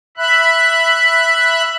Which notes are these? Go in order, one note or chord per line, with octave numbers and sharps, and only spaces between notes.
E5 B5 F#6